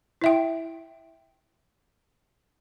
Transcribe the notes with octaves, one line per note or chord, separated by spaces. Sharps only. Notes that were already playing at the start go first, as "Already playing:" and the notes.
E4 E5 G5